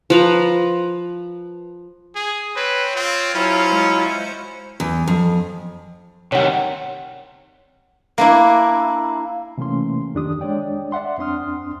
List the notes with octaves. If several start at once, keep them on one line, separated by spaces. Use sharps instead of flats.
F3 B4 A#5
G#4
C4 B4 C#5
C4 F4
F#3 C#4 E4 C5 C#5
G#3 C5 C#7
E2
F2
C3 D#3 G3 C#5 F#5
A#3 D4 E4
C3 E3 A3 A#3 C#4 C6
F2 D#3 D4 G4 D#6
G#3 D4 C#5 D5 G5
D5 E5 F#5 C6
F2 C4 D4 C6 D#6 F6